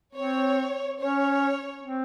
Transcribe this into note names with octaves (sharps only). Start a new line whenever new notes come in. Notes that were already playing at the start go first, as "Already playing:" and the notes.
C4 C#5
C#4 C#5
C4